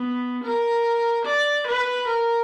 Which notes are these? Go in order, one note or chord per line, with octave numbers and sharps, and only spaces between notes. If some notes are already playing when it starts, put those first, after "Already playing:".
Already playing: B3
A#4
D5
B4
A#4